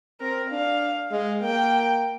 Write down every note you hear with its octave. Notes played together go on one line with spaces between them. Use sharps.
C4 A#4
D4 F5
G#3 F5
A#3 G5